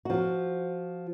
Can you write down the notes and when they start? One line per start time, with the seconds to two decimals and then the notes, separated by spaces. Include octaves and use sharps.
0.05 F3 F#4